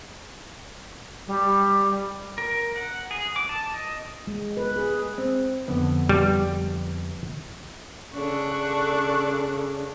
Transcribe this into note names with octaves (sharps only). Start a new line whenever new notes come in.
G3
A#4
F#5
G#4
D6
A5
D#5
G#3
B4
G#4
C4
F2 D3 B3
G3
C#3 D4 A4 C#6 F#6